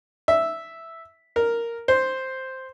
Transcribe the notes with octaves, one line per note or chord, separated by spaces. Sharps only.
E5
A#4
C5